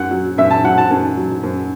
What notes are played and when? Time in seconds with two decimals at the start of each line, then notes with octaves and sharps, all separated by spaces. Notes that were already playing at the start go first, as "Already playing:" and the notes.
Already playing: F#2 F#5
0.11 F#3
0.38 F#2 E5
0.51 A5
0.63 F#3 F#5
0.78 A5
0.90 F#2
1.17 F#3
1.43 F#2